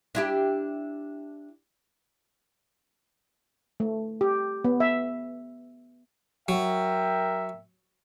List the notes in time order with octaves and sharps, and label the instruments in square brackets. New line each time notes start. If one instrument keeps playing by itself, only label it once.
[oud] D4 E4 G4
[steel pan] A3
G4
B3
E5
[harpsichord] F#3 [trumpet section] A#4 E5 G5